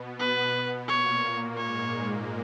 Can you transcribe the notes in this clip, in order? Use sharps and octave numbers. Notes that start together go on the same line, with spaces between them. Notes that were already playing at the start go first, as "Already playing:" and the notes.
Already playing: B2 B3
B4
A#2 A#3 C#5
G#2 G#3 C#5